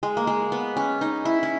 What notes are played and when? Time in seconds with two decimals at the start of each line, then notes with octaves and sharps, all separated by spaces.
0.03 G#3
0.17 A#3
0.27 G#3
0.52 B3
0.77 C#4
1.01 D#4
1.25 E4
1.43 C#4